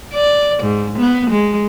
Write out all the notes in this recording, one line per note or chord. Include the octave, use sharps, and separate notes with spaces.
D5
G#2
B3
G#3